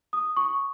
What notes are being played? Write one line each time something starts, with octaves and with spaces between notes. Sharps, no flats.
D#6
C#6